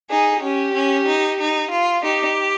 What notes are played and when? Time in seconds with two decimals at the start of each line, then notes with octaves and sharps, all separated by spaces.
0.09 D#4 G#4
0.42 C#4 G4
0.73 C#4
1.06 D#4
1.38 D#4
1.70 F4
2.03 D#4 G4